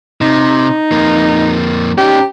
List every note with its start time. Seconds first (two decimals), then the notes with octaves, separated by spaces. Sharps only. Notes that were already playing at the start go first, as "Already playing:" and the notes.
0.21 C3 D#4
0.92 F2 A#3
1.98 C#4 D#4 G4